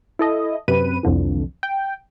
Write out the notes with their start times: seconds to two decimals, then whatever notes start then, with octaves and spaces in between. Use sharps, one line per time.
0.19 E4 A4 D#5
0.68 F#2 C3 B4 D#7
1.03 C2 F2 D3 E3
1.63 G5